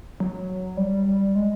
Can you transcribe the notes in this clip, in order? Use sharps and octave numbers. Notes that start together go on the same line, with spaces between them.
F#3
G3
G#3